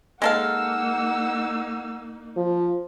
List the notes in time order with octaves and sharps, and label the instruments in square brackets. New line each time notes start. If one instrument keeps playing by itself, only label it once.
[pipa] G#3 A4 F5 [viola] A#3 D#4 [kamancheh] F#5 E6
[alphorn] F3